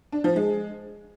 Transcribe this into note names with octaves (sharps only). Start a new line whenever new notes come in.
D4
F3
G#3